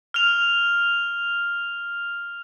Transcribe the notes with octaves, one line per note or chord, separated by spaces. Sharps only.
F6 F7